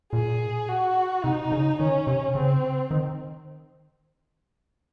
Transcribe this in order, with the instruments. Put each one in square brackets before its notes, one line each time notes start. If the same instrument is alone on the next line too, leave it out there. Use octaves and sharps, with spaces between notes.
[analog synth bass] A#2 [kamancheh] G#4
[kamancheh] F#4
[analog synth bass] C3 [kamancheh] D#4
[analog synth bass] C#3
[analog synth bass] D#3 [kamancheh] C#4
[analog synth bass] C3
[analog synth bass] C#3 [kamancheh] C4
[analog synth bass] D#3